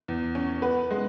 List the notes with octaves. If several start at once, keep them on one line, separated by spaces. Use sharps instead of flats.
E2
C#4
B3 B4
G#3